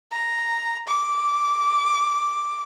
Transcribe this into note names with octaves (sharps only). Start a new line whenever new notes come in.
A#5
D6